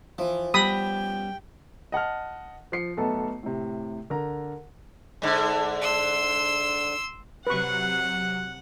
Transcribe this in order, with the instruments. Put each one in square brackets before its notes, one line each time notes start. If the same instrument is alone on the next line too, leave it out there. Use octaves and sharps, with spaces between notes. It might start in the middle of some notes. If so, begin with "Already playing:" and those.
[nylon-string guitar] E3 E4 [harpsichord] F3
[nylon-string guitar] G3 B3 C#4 [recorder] G5 [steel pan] B5 D#6
[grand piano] D#5 F#5 A5 F6
F3 C7 C#7
B1 A3 B3 A4 A5
A2 C3
D3 A#4 A#5
[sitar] G#2 D3
[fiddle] C6 E6
[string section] C3 F#3 [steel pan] B4 C#6 [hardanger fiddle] F#5 [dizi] F#6